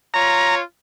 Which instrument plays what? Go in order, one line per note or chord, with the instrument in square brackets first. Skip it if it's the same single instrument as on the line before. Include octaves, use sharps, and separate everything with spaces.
[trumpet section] F4 C#5 [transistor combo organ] A#5